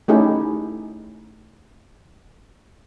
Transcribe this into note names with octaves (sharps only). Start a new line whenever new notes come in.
A3 C#4 D#4 E4 G4 G#4